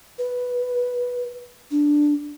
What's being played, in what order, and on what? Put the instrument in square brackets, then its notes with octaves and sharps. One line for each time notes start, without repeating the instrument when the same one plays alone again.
[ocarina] B4
D4